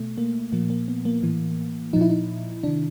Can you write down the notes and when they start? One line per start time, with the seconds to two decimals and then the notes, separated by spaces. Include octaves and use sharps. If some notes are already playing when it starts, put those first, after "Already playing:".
Already playing: B2 A3
0.18 A#3
0.52 A#2 F3 A#3
0.70 A#3
0.88 B3
1.05 A#3
1.23 A2 E3
1.93 A#2 F3 D#4
2.01 E4
2.10 D#4
2.63 C3 D#3 D4